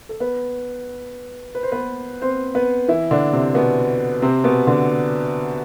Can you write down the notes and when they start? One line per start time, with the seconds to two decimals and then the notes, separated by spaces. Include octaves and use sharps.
0.09 A4
0.20 B3 B4
1.55 B4
1.63 C5
1.72 B3 B4
2.22 C4 C5
2.55 B3 B4
2.88 E3 E4
3.11 D3 D4
3.33 C3 C4
3.55 B2 B3
4.22 C3 C4
4.44 B2 B3
4.67 D3 D4